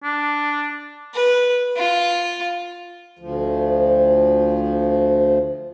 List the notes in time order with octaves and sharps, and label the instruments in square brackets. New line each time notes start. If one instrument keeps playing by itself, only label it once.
[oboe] D4
[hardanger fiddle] B4
F4
[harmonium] D2 F3